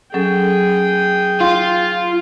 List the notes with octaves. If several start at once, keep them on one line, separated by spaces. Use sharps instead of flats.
F#3 C#4 G#4 A4 G5
F4 C6